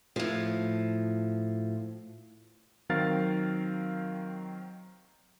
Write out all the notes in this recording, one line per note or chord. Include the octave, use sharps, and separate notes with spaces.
A2 F3
D#3 F#3 C4 A#4 F5 A6